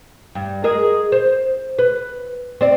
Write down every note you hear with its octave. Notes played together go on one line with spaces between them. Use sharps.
G2
G#4 A#4 D#5
C5
B4
C4 D5